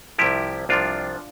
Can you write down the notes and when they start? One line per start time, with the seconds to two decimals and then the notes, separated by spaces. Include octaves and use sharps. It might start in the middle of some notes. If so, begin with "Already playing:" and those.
0.18 C2 C3 F3 E4 G4
0.69 C2 C3 F3 D4 F4